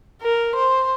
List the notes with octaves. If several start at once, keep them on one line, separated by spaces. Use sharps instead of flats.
A#4
C5